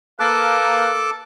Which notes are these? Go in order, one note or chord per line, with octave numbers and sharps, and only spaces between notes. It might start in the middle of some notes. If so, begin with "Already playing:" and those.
A#3 A4 B4 F5 A5 D6